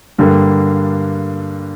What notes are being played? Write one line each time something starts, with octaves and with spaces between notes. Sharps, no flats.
G2 D3 G3 A#3